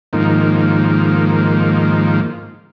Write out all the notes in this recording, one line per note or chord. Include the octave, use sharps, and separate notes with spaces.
G#2 D#3 F3 A#3